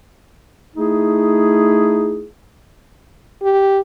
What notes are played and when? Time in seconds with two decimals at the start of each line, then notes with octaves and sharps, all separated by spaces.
0.76 A3 D#4 E4 G#4
3.43 G4